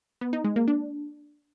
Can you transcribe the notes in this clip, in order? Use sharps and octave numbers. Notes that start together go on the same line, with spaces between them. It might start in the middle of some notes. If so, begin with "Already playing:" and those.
B3
D#4
G#3
A#3
D4